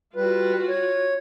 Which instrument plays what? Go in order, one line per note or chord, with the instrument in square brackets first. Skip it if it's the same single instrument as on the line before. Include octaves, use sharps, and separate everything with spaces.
[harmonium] G3 B4 [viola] F4 F#4
[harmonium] C#5